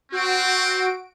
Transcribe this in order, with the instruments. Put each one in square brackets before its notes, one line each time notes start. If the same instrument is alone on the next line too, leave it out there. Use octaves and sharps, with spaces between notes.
[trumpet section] C4 [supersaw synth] F#4 D7